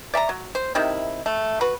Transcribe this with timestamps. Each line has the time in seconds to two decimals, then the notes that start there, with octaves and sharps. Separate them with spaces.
0.14 D5 E5 A5 A#5
0.29 F#3
0.55 C5
0.75 C3 D#3 E4
1.26 A3
1.61 F#4 B4